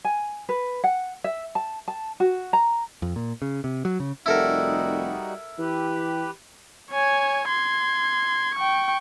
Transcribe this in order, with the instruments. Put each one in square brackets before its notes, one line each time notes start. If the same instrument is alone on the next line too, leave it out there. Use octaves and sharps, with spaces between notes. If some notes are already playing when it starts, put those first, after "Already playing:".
[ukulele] G#5
B4
F#5
E5
A5
A5
F#4
A#5
[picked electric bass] F2
A#2
C#3
C3
F#3
C#3
[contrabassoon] F1 [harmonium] G3 D#4 F#4 [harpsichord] E4 A4 A#4
[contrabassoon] E3 [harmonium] G4 B4
[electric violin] C#5 G#5
C6 G#6
G5 C#6